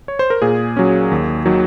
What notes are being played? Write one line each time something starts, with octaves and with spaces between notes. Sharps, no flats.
C#5
C5
A#4
A#2 G#4
F#3 C#4
D#2
D#3 F#3